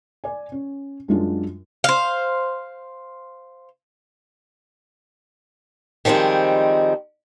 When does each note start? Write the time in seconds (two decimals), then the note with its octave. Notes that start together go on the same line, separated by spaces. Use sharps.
0.24 D5 G#5
0.52 C#4
1.08 F#2 F#3 G#3 D4 F4 F#4
1.84 C5 F5
6.05 D#3 F3 G3 G#3 C4